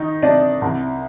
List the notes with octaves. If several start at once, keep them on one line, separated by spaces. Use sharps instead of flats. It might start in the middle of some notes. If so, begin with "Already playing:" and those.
Already playing: D#3 D#4
C3 D4 D5
C2